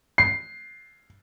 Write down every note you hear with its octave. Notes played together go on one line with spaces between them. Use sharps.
C7